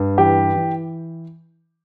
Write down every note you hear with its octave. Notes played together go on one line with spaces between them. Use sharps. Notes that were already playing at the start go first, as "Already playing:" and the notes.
Already playing: G2
E3 G4
E3